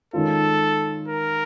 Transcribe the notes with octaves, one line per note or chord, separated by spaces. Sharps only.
D#3 G#3 C#4 F4 A4
A#4